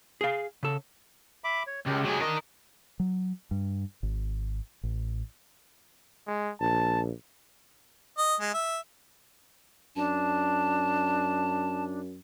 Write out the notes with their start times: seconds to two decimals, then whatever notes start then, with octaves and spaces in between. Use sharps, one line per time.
0.21 G#4 F5
0.63 C#3 A4
1.44 E5 B5 D6
1.67 C#5
1.86 C#2 G#3 G4
2.04 F#3 G#4
2.20 D4 A#4 D#5
3.00 F#3
3.51 G2
4.03 G#1
4.83 A1
6.27 G#3
6.61 A#1 A5
8.18 D#5
8.41 G#3
8.54 E5
9.96 F#2 D4 A5